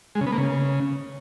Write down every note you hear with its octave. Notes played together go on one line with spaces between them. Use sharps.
G#3
C#3
B3
A#3
C#3